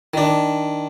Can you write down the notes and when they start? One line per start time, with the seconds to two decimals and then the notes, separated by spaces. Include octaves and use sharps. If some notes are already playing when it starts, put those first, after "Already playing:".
0.14 D#3 D4